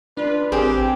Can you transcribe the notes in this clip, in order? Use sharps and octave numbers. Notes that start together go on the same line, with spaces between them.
D4 F4 B4
A1 C4 G4 G#4 A#4